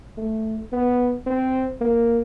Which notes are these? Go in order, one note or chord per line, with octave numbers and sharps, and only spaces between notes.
A3
B3
C4
A#3